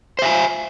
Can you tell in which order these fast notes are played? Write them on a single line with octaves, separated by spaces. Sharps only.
C5 E5 G#5